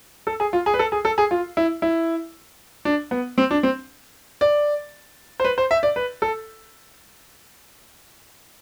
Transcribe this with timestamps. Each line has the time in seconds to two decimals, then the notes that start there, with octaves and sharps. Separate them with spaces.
0.27 A4
0.40 G#4
0.53 F4
0.66 G#4
0.74 B4
0.79 A4
0.92 G#4
1.05 A4
1.18 G#4
1.31 F4
1.57 E4
1.82 E4
2.85 D4
3.11 B3
3.38 C4
3.51 D4
3.63 C4
4.41 D5
5.40 C5
5.45 B4
5.58 C5
5.71 E5
5.83 D5
5.96 B4
6.22 A4